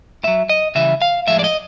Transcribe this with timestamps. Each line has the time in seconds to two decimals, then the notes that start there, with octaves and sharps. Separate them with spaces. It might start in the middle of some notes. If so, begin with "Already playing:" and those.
0.24 A2 F#3 E5
0.49 D#5
0.75 C#3 E3 G3 E5
1.02 F5
1.27 A2 F3 G#3 E5
1.39 D5
1.44 D#5